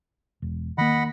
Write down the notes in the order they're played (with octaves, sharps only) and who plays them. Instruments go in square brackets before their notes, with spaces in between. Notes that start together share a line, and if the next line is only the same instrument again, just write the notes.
[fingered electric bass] E1
[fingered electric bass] D#3 A#3 [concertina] D#5 F#5 B5